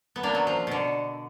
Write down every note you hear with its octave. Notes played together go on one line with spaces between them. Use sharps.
B3
A#3 D4
F#3
F3
B2 D3